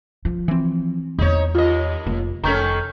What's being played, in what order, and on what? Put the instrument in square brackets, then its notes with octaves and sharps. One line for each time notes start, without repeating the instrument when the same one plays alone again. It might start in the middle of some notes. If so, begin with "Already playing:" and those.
[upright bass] F3
[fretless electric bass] E3 C4
[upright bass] E2 A#3 [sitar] D#4 C#5
[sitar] D#2 D#5 [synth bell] F4
[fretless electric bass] F1 [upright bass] A#3
[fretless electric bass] F1 [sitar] D#3 C#4 A4 [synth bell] A#5 C#6 G6